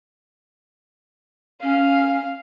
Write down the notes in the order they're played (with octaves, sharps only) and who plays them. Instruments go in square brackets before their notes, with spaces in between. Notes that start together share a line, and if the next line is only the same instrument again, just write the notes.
[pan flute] C#4 [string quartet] F5